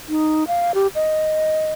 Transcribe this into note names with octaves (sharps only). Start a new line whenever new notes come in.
D#4
F5
G4
D#5